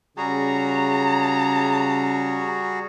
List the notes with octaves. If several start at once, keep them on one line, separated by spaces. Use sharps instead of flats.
C#3 G3 F#4 G#4 A#5